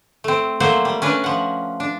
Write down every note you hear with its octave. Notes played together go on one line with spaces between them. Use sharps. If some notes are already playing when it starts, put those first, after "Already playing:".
A3 C4
F3 F#3 A3 A#3 C5 F#5
G3
C#4 D4 B4 C#5
F3 F#5
D4